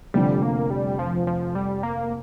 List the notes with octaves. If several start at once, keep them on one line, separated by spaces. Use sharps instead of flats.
F1 F2 D3 G3
A#3
G3
F3
F3
G3
A#3